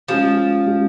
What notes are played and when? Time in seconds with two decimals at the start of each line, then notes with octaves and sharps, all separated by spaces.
0.08 F3 G#3 C#4 G#4
0.66 G#3 C#4 G#4